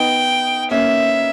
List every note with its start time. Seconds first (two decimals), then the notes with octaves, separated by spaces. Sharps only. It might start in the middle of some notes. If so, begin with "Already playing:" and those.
Already playing: B3 D#4 G5
0.70 A#3 C#4 E5